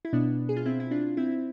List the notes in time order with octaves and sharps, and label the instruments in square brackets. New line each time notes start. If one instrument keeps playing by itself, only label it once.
[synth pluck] E4
B2 B3 D4
G#4
F4
C4 E4
E4
D4 F4
C4 E4